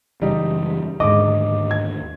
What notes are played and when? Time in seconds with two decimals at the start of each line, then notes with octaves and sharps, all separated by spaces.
0.22 F#2 C#3 E3 G3 D#4
1.00 D#2 G#2 D3 D#5 D6
1.71 G#6